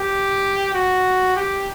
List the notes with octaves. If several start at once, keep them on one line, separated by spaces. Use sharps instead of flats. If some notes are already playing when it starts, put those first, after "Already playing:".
Already playing: G4
F#4
G4